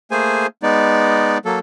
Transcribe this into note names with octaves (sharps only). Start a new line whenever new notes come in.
A3 A#3 G#4 C5 G#5
G#3 B3 D#4 D5
F#3 A#3 A4